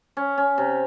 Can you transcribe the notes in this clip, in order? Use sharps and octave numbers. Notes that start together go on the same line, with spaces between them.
C#4
C#4
C3